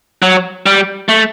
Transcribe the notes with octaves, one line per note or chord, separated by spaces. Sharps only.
F#3
G3
A3